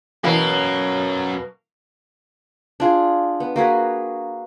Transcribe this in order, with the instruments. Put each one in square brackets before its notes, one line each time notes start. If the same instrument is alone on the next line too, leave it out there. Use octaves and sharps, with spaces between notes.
[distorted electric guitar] F#2 A#4 [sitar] B2 A#3 [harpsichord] E3 E4 G4
[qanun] D4 F4 G#4
B3
A#3 F#4 G#4 B4